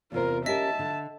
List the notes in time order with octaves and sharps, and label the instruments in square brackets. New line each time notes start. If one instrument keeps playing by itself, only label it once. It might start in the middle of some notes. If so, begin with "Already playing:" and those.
[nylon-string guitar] E2 C3 C5 [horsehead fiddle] F4 A#4
[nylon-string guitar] C#4 G4 A#4 [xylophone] D#5 B6 [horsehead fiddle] E5 A5
[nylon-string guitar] D3